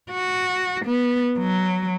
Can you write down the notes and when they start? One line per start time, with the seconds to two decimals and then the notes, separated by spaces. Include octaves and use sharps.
0.11 F#4
0.85 B3
1.39 F#3